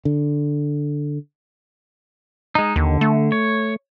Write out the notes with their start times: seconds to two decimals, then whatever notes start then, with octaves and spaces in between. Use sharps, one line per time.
0.05 D3
2.55 G#3 D#4
2.76 D#2 D3
3.01 A3
3.32 C#5